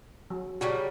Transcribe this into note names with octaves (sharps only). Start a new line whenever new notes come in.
F#3
C#3 F#3 G3 F#4